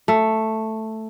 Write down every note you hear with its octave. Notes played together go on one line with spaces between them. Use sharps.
A3